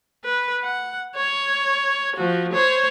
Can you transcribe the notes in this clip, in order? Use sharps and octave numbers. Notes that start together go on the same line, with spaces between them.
B4
F#5
C#5
F3 F#4
C5 C#5